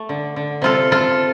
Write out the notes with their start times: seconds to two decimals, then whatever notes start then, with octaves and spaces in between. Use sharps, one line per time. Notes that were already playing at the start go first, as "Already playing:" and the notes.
Already playing: A3
0.09 D3
0.36 D3
0.62 C3 F4 A4
0.91 C3 F4 A4